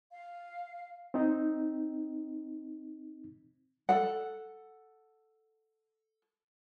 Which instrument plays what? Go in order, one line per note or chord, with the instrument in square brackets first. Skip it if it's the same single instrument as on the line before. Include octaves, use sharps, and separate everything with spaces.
[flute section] F5
[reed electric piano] C4 D#4
[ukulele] A4 F#5